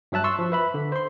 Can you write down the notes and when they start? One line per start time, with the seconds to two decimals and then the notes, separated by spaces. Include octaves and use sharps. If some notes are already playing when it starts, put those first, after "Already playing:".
0.12 G2 F#3 E5 A5 F#6
0.24 C6 C#6 E6
0.39 F3
0.52 B4 E5 B5
0.74 D3
0.92 C5 C6